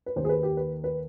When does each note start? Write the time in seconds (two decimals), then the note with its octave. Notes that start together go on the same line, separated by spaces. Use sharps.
0.06 B4
0.16 D#2 D#3 C5
0.25 G#4
0.29 B4
0.43 G4
0.57 B4
0.84 B4